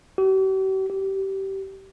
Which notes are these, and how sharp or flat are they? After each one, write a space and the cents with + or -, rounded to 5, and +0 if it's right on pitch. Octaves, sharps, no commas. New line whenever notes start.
G4 -45
G4 -20